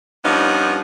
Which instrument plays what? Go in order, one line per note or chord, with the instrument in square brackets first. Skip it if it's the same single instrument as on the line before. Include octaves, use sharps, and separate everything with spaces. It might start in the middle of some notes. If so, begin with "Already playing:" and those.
[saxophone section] G2 F3 B3 C#4 D#4 F4